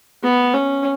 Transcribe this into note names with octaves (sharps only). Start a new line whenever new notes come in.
B3
C#4